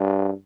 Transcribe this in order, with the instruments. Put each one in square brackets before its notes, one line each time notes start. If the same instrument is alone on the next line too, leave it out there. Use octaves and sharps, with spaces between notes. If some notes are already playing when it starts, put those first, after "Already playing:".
Already playing: [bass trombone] G2